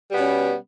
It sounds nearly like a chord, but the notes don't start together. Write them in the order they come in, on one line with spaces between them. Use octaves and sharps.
G3 B3 B2 C#4